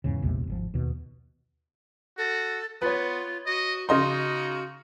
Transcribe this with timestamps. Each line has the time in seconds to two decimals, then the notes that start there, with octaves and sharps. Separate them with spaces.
0.04 E2 G#2 C#3
0.22 A#1 E2 C3 G#3
0.47 G#1 D3 F3
0.74 D#2 B2
2.18 F#4 A4
2.82 B3 F4 B4 C#5
3.46 F#4 D#5
3.89 C#3 D#4 F#4 D#5 C6